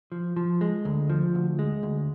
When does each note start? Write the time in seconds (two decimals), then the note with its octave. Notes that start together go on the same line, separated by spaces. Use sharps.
0.12 F3
0.36 F3
0.61 G#3
0.85 D2
1.10 F3
1.35 D2
1.59 G#3
1.83 D2